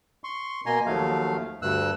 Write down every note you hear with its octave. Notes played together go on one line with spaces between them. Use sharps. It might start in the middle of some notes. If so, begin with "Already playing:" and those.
C6 C#6
B2 A#3 G#5 A#5 C6
D#2 F3 F#3 A3 F5
D2 G2 E6 F#6